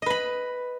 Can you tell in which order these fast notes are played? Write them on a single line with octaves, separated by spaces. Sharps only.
D#5 B4 B5